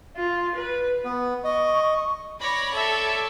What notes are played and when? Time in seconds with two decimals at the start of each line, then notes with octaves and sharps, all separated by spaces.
0.16 F4
0.56 B4
1.05 B3
1.44 D#5 C#6
2.41 C#5 D5 B5 A#6
2.75 A4 E5